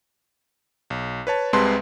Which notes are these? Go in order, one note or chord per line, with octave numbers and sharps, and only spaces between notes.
B1
B4 C#5 A5
C2 C3 G#3 B4 A5 C6